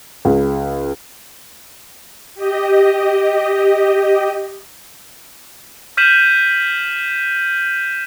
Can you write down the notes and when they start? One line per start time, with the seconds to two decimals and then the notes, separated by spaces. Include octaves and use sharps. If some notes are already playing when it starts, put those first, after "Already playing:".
0.25 C#2
2.35 G4 D#5
5.97 F6 G6 B6 D#7 E7 F#7